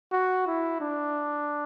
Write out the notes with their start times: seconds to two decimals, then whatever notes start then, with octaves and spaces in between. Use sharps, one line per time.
0.12 F#4
0.47 E4
0.81 D4